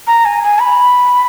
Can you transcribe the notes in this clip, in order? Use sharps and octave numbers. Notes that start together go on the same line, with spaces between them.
A#5
G#5
G#5
B5